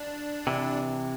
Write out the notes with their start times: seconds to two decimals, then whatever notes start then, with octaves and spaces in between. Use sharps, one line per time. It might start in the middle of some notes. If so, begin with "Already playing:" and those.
Already playing: D4
0.47 C3 E3